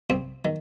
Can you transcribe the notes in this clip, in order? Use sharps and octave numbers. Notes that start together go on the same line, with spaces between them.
C2 C4
D#3